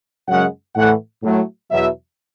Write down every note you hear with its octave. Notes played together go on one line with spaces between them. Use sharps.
F#2 C#3 G#3 F#5
A2 E3 A3 F#5
A2 F#3 A3
E2 B2 F#3 E5